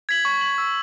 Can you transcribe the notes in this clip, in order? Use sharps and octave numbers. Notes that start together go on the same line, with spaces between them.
G#6 B6 F#7
C#6
G#6 B6 F#7
E6